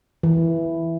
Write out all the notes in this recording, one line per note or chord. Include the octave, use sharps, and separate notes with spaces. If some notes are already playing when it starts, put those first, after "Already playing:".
E3